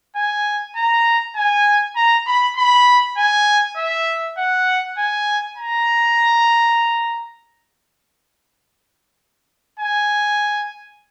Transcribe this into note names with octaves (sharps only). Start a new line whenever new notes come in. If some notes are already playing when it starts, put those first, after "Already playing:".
G#5
A#5
G#5
A#5
B5
B5
G#5
E5
F#5
G#5
A#5
G#5